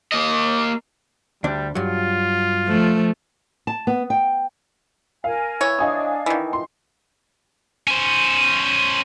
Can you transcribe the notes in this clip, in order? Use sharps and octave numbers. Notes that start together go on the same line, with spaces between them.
A#3 D#5
D2 G3 D4
G2 F#3 F4
F3 A3
A5
B3
G5
A#4 F5 G#5
E3 C#5
D4 D#5 F5 G#5 D#6
D#3 E3
D#4 C6
C#4 C5